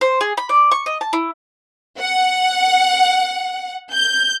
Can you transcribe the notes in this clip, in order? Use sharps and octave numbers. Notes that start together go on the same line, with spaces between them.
C5
G#4
B5
D5
C#6
D#5
A5
E4
F#5
G6